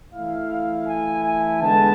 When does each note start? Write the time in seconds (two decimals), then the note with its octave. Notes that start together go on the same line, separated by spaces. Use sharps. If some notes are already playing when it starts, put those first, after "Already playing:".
0.13 E3 A3 E4 F5
0.87 G#5
1.24 G#5
1.61 D3 G#3 B3 A5